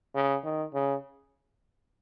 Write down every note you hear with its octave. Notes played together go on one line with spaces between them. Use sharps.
C#3
D#3
C#3